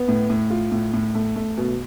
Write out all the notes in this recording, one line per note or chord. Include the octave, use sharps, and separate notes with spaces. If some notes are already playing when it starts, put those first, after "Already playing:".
Already playing: B3
A2
A2
F4
A2
A2
A3
A3
B2